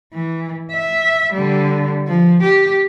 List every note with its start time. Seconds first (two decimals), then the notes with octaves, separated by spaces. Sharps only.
0.13 E3
0.72 E5
1.33 D3 G3
2.07 F3
2.43 G4